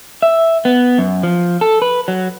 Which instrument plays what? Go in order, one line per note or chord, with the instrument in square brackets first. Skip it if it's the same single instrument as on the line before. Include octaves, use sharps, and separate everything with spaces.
[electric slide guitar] E5
B3
F#2
F3
A4
B4
F#3